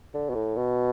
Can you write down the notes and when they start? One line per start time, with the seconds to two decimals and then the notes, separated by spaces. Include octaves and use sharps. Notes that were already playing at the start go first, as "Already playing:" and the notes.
0.14 D3
0.30 B2
0.35 A2
0.56 B2